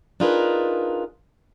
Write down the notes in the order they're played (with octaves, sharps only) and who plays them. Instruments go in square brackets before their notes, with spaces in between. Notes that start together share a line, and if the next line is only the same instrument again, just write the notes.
[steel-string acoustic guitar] D4 D#4 F4 G#4 A#4 B4